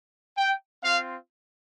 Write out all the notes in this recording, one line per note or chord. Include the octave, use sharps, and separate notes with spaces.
G5
C4 F4 F5